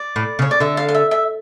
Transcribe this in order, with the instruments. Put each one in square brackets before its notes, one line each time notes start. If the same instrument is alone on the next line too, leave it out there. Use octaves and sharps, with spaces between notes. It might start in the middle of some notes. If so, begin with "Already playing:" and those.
Already playing: [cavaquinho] D5
[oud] A2
C#3
[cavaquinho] C#5
D5
[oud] D3 [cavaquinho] E5
[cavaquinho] F5
F5
E5
E5